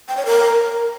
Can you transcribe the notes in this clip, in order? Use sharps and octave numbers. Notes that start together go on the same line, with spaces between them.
G5
C#5
A#4